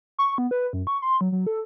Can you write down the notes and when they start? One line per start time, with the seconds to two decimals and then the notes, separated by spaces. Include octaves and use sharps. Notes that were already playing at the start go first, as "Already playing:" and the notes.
0.19 C#6
0.38 B3
0.51 B4
0.73 F#2
0.87 C#6
1.02 C6
1.21 F#3
1.32 F#3
1.47 A4